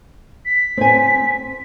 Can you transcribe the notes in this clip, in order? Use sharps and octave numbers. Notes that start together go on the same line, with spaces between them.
B6
C4 G#5